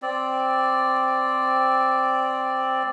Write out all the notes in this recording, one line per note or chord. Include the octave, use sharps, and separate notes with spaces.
C4 D5